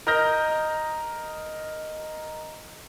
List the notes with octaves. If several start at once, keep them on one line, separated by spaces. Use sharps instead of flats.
A#4 D#5 D#6 F6 G6 A#6